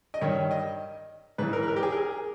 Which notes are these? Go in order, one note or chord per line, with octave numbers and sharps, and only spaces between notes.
D#5
G2 D#3 C#5
D#5
G#2 E3 B4
A#4
B4
A#4
G4
G#4
A#4
G#4